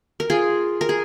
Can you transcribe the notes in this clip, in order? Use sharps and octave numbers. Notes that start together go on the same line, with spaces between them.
A#4
F4 G#4
A#4
G#4